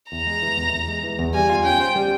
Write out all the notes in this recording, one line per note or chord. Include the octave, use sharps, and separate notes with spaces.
E2 A#5
G#3
E3
E2
E2
G#3
E3
E2
G3 G#5
F4
C#4 G5
C5
G3